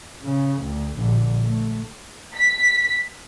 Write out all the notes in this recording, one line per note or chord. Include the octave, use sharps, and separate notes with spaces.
C#3
D2
A#1 D3
A3
B6